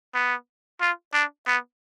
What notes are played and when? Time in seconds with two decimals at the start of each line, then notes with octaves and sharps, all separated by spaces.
0.15 B3
0.81 F4
1.14 D4
1.47 B3